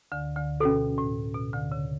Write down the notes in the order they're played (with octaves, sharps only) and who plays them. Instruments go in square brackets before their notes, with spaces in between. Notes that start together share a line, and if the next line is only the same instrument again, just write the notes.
[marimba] D2 D3
D2 D3
[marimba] B2 [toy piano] C#4 F#4 A4
[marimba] A2
B2
D2 D3
C#3